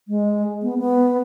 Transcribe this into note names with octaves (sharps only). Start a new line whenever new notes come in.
G#3
B3
B3